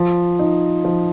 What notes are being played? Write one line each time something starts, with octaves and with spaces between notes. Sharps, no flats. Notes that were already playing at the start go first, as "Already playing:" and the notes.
Already playing: F3
D#4
F3